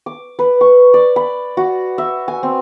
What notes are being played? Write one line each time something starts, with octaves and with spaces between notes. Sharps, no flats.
D6
B4
C#6
D5
B5
F#4
E5
G#5
C4